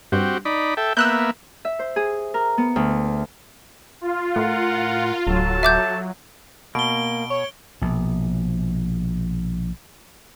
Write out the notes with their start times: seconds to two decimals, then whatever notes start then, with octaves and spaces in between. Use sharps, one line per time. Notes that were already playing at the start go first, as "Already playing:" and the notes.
0.12 G2 C4 F#4 G4
0.45 D#4 D5 B5
0.77 A4 E5 G5
0.97 A#3 B3 E5 E6 F#6 G6
1.65 E5
1.79 C5
1.96 G#4
2.34 A#4
2.58 B3
2.76 D2
4.01 F4
4.36 A2 A#4 F#5
5.27 D1 F#3 A4 A5
5.63 E5 D6 G6
6.75 B2 A#3 D7 G7
7.30 C#5
7.82 A#1 B2